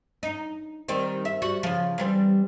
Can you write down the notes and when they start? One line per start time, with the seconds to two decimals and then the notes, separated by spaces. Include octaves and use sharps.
0.23 D#4
0.88 D#3 G3 C4
1.25 E5
1.42 G3 F#4
1.63 C#3 F3
1.98 E3 G3 C4